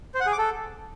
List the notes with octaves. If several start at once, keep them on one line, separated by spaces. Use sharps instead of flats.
C5
F#5
G#4
D6
A4